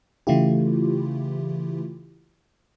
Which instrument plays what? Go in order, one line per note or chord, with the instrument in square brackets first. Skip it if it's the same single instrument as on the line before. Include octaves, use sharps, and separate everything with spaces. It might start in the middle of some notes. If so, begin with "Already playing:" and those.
[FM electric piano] C#3 E3 A3 E4 F4 G4